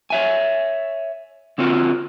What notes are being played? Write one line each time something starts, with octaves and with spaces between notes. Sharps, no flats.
C#5 E5 G#5
D3 C4 C#4 F4 F#4 A#4